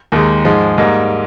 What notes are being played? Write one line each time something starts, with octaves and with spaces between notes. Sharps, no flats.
D#2 D#3 G#3
G#2 F3 G#3
G#2 G3 A#3 D#4